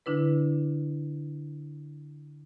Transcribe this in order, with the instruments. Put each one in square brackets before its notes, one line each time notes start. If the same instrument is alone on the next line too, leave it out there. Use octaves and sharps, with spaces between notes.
[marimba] D3 D4 E4 B4